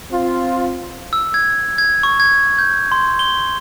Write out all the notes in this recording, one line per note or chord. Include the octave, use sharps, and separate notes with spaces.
C4 F4
E6
G#6
G#6
C#6
G#6
G6
C6
G7